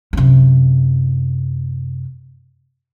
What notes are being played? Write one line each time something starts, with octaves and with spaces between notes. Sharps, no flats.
F#2 C3